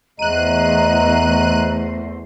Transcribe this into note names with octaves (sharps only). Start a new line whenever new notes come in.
E2 A3 C5 D#5 A#5 F#6 D#7